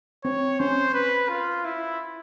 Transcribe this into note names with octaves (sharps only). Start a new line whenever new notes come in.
C4 C#5
C#4 C5
B4
F4
E4